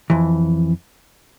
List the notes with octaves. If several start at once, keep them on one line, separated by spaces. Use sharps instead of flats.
F2 E3